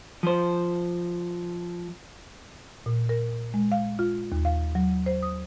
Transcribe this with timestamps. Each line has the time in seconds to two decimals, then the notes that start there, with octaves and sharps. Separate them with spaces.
0.23 F3 C5
2.86 A#2
3.09 A#4
3.54 G#3
3.72 F5
3.99 F4
4.32 D#2
4.45 F5
4.75 F#3
5.06 C5
5.23 D#6